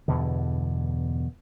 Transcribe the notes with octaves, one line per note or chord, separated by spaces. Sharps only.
E2 G2 B2 D3